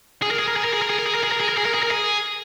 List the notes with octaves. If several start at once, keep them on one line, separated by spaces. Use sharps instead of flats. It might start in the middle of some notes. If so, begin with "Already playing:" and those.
G#4
A#4
G#4
A#4
G#4
A#4
G#4
A#4
G#4
A#4
G#4
A#4
G#4
A#4
G#4
A#4
G#4
A#4
G#4
A#4
G#4